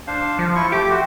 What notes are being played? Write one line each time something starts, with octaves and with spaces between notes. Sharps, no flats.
D4 C5 F5
F3
E4 F4 C#6
A3 G4 D6
F#4 C5